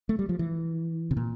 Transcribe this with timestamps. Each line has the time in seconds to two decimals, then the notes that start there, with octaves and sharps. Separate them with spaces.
0.09 A3
0.19 G3
0.29 F3
0.39 E3
1.11 C3
1.17 A#2